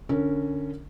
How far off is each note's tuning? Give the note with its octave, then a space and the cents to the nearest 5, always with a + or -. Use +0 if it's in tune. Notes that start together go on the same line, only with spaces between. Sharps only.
D3 +0 C#4 +0 A#4 -30